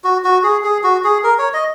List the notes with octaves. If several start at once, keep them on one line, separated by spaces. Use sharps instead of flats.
F#4
F#4
G#4
G#4
F#4
G#4
A#4
C#5
D#5